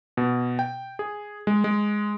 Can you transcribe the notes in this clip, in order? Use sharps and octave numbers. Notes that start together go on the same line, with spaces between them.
B2
G5
G#4
G#3
G#3